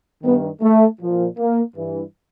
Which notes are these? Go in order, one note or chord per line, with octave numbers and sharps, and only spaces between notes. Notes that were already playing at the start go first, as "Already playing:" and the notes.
G2 D#3 B3
A3
A#2 F3
A#3
G2 E3